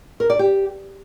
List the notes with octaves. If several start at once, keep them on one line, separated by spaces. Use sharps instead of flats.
A#4
D5
G4